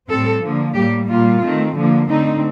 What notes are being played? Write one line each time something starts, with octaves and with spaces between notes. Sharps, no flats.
A2 G3 C4 A4
D3 F3 A#3
A2 G3 A#3 G4
A#2 G3 A#3 F4
D#3 A3 C4
D3 F3 A#3
D3 A3 C4 D#4